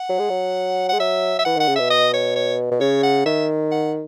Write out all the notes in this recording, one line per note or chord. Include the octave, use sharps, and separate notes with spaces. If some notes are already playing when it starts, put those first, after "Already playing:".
Already playing: F#5
F#3
G#3
F#3
G#3 F#5
F#3 E5
E5
E3 F#5
D#3 F#5
C#3
B2 E5
D#5
C#5
C#5
B2
C#3 C#5
F#5
D#3 E5
F#5